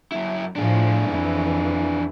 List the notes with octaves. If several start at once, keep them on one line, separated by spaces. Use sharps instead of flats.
F#2 E4
A2 F3 D4 G#4
F2 E3